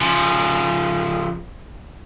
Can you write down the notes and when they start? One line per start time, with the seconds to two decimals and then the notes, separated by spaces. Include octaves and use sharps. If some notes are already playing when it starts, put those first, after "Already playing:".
0.01 C#3 F3